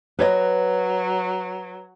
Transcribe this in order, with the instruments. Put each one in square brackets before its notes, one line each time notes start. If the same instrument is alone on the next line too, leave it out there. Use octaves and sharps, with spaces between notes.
[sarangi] F#3 [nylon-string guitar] B4 C#5 D#5